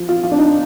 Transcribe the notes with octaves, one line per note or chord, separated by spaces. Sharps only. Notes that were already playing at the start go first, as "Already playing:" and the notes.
Already playing: F3
F4
F3 F4
D4
D#4